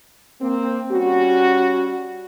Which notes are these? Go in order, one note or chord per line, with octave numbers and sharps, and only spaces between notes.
A#3 C4
G3 C#4 F#4